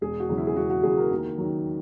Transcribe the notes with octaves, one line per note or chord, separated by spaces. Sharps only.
E1 G#4
F#4
E2 C#3 F#3
E4
G#4
E1 F#4
F#4
E2 C#3 F#3 G#4
A#4
D#2
D#3 F#3